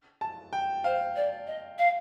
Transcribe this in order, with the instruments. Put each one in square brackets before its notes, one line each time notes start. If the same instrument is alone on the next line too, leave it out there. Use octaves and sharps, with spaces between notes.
[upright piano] A5
G5
[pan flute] C5 [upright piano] F5
[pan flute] D5
D#5
F5